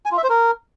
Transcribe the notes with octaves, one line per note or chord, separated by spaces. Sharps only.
G#5
F4
E5
C5
A#4